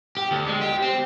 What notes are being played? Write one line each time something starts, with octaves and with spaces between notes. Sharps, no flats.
G4
D2
G#3
G4
C4